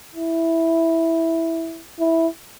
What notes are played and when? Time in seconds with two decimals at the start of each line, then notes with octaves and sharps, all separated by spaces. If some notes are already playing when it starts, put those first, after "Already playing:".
0.15 E4
1.99 E4